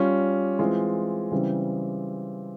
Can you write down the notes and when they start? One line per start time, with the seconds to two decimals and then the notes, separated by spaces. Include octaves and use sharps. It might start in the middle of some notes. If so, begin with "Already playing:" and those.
Already playing: G3 C#4 F4
0.59 E3 G#3 C4 F4
1.31 C#3 E3 G3 C4